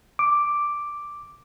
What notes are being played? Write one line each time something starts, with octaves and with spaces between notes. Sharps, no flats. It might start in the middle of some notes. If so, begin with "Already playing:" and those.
D6